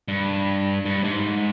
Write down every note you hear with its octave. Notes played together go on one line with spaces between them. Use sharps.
G2
G2
G#2